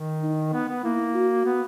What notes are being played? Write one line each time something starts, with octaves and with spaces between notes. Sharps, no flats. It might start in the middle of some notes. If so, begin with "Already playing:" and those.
Already playing: D#3
D#4
B3
B3
A#3 E4
F#4
B3